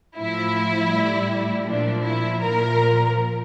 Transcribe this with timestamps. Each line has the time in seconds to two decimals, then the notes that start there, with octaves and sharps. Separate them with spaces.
0.16 A2 F3 E4
0.91 A2 G3
1.66 A#2 F3 D4
2.03 E4
2.41 A#2 F3 A#4